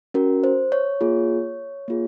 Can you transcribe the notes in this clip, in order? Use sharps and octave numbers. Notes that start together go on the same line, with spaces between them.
C#4 F#4 A#4
C5
C#5
A#3 F4 G#4
A#3 F4 G#4